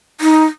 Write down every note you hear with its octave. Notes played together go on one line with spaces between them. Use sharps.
D#4